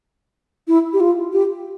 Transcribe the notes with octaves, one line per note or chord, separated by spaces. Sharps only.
E4
G4
F4
G4